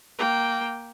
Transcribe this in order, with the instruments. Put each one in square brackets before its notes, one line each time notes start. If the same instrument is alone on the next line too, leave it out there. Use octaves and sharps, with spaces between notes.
[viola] A#3 G5